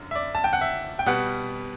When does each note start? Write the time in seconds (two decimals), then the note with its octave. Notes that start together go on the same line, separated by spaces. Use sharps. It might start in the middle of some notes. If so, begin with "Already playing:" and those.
Already playing: F#2 D3
0.11 E5
0.15 D5
0.35 A5
0.44 G5
0.53 F#5
0.61 E5
0.99 G5
1.06 B2 G3 B3 F#5